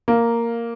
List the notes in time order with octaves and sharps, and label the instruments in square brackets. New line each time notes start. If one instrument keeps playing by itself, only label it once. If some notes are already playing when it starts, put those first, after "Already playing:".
[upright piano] A#3